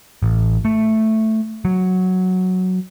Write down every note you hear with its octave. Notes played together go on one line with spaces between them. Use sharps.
A1
A3
F#3